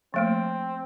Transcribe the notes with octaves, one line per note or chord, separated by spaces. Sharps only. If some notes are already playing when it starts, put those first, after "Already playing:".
F3 A3 A#3 C4